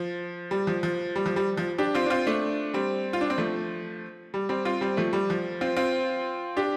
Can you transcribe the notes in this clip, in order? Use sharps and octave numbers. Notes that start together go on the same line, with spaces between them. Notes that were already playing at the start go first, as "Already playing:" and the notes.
Already playing: F3
G3
F3
F3
G3
F3
G3
F3
D4 G4
C4 F4
D4
C4 F4
A3 D4
G3 C4
F4
D4
C4
F3 A3
G3
G3 C4
C4 F4
G3 C4
F3 A3
G3
F3
C4 F4
C4 F4
D4 G4